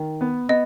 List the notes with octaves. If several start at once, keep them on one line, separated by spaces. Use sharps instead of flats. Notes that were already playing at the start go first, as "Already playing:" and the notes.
Already playing: D#3
B3
B3 D#5